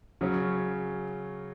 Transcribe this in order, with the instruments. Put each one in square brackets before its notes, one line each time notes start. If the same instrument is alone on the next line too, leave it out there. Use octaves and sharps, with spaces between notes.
[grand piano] C#3 F#3 C#4